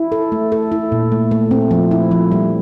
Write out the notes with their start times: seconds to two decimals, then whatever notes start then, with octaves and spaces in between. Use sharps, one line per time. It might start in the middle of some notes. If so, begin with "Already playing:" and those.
Already playing: E4
0.12 A4
0.32 A3
0.52 A4
0.72 E4
0.92 A#2
1.12 A3
1.31 A3
1.51 C4
1.71 F3
1.91 E4
2.11 F3
2.32 G3